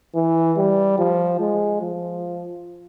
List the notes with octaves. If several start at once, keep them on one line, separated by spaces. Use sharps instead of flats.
E3
G3
F3
G#3
F3